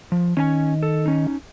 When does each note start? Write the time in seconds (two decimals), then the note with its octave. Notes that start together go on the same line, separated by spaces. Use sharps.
0.12 F3
0.37 D#3 C#4 D4 G#5
0.83 A4
1.06 C#4 D#4